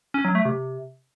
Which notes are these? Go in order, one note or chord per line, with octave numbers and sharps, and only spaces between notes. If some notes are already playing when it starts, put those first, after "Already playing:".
C#4
F#3
A3
C3